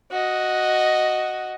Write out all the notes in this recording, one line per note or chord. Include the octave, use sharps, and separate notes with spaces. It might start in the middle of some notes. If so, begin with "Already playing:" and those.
F#4 D#5